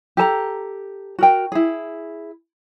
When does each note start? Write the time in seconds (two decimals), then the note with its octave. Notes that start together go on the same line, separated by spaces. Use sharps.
0.17 G4 A4 A5 A#5
1.19 F#4 A#4 G5
1.52 E4 G#4